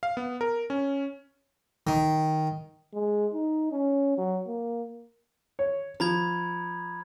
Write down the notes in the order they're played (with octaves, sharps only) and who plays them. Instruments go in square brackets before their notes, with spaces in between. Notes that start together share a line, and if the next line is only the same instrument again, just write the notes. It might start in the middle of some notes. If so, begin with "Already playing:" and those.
[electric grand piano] F5
B3
A#4
C#4
[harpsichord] D#3
[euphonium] G#3
D#4
C#4
F#3
A#3
[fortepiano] C#5
[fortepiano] F3 [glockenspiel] A#5 B5 G#6